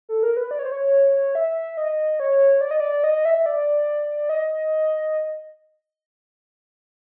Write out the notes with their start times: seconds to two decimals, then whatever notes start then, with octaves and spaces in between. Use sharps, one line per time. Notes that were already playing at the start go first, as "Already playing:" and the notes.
0.09 A4
0.23 A#4
0.37 B4
0.51 D5
0.59 C#5
0.65 C5
0.72 C#5
1.35 E5
1.77 D#5
2.20 C#5
2.61 D5
2.71 D#5
2.80 D5
3.04 D#5
3.25 E5
3.46 D5
4.29 D#5